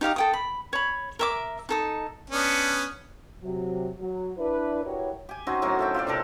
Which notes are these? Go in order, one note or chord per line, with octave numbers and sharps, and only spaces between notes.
D#4 G4 F5 D#6
A4 G5 D#6
B5
C#5 B5
A#4 E5 D6
D#4 A4 D#6
B3 C#4 D4
C3 F#3
F#3
D4 E4 B4
E4 F#4 G4 A#4 B4 C#5
G4 G#5
C4 C#4 D#4 F#4
A2 F#3 A#4
A4 E5 G5
F4 G4 A4 D5
C3 D4 A4 A#4